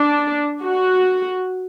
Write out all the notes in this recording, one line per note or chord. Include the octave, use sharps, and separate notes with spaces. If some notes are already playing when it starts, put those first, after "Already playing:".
Already playing: D4
F#4